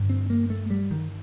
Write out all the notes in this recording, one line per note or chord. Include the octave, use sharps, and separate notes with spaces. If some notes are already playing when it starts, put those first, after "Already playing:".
Already playing: G2 D3
C4
A#3
A3
G3
D#3